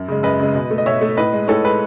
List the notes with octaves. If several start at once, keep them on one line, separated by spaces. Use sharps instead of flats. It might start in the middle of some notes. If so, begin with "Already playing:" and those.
Already playing: F#2
C#3 G#3
F#2 B4 D#5
C#3 G#3
B2
A3
D#5
B2 C#5 E5
A3
A2 B4 D#5
G#3
A2 A4 C#5
G#3 B4